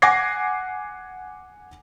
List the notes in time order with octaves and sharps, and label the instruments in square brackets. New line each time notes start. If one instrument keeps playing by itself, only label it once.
[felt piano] F#5 G#5 D6 G#6 A#6 C7